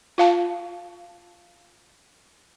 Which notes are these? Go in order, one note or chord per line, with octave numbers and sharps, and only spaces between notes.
F4 F5 A5